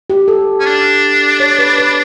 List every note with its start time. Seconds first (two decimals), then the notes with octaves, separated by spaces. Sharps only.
0.10 G4
0.28 A4
0.60 C#4
0.66 D4
1.40 C#5
1.59 B4
1.78 B4